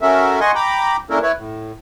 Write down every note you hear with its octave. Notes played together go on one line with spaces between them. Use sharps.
C#4 F#4 A4 A#4 E5
D#5 F#5 G#5 C6 C#6
G5 A#5 B5 D6
A#3 C#4 D4 E4 A4 A#4
E4 B4 C#5
A2